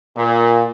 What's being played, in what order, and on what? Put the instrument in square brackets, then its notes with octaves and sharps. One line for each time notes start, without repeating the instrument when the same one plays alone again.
[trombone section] A#2